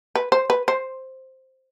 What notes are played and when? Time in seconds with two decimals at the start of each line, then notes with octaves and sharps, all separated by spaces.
0.15 B4
0.32 C5
0.50 B4
0.68 C5